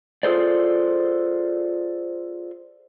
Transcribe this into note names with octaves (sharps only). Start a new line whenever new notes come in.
F4 G#4 A4 C5 D5